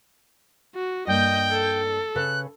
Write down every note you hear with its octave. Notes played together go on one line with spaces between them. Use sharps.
F#4
G2 A#3 D#5 G5 G6
A4
C#3 B4 F#6